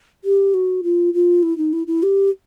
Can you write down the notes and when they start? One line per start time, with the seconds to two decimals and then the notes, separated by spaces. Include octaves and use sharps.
0.24 G4
0.54 F#4
0.83 F4
1.14 F4
1.42 E4
1.57 D#4
1.73 E4
1.87 E4
2.03 G4